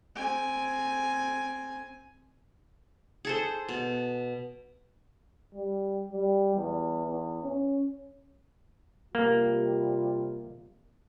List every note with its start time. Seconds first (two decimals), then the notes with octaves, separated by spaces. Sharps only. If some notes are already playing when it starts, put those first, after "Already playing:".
0.15 C4 G#5
3.25 G#4 A4 C5
3.69 B2
5.54 G3
6.13 G3
6.56 E2
7.06 E2
7.43 C#4
9.15 C3 G3 A#3 F4